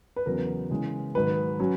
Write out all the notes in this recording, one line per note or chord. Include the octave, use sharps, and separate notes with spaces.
B4
E2 C#3 F#3 B3 A#4
C#3 E3 G#3 C#4
G#2 D#3 F#3 B4
F#3 C#4